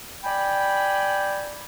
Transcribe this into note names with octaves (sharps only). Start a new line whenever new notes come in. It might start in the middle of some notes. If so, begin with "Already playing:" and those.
D5 G5 G#5 B5